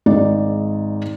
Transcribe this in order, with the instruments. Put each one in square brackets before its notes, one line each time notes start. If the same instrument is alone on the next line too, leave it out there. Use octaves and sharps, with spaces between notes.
[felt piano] G#1 G#2 D#4 D5